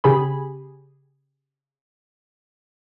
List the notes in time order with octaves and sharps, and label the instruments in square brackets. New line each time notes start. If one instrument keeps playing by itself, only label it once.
[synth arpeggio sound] C#3 G4 G#4 G#5 B5